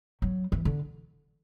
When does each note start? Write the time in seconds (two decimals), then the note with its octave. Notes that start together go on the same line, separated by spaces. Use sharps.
0.22 F#3
0.52 E3
0.65 D3